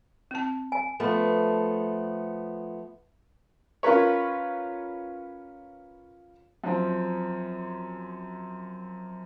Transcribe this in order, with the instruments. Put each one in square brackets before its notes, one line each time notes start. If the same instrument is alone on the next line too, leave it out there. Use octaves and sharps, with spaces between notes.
[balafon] C4 A5
[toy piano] G#5
[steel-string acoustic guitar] F3 A3 B3
[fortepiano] C#4 F4 A#4 B4 C#5
[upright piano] F#2 F3 C4